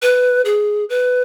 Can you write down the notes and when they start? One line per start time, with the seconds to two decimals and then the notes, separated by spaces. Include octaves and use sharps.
0.02 B4
0.45 G#4
0.90 B4